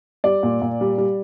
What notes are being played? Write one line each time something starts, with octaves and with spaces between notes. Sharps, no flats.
G3 D5
A#2
A#2
G3
G3